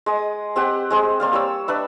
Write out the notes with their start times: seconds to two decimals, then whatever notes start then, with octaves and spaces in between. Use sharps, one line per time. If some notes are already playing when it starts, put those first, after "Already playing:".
0.06 G#3 D#6
0.56 C4 G4 F#5
0.90 G#3 C4 G#4
1.20 A#3 C4 D5 F5
1.33 G3 C#5 E6
1.68 D4 B4 E5